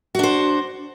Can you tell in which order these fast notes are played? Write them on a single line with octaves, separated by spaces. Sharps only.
F#4 D4 C5